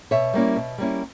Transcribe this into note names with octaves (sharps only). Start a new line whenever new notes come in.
B2 C#5 E5
G3 A#3 C#4 E4
B2
G3 A#3 C#4 E4